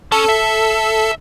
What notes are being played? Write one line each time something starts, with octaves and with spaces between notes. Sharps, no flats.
C#4 A4
E5